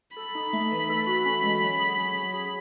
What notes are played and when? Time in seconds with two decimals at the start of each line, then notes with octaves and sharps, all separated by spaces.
0.17 A4 B5
0.35 D#4
0.53 A3
0.72 E3
0.90 A4
1.07 F#4
1.25 C#4
1.43 G#3
1.62 F#3
1.79 G#4
1.97 C#4
2.15 F#3
2.34 G#4